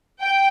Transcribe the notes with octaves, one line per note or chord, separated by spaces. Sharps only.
G5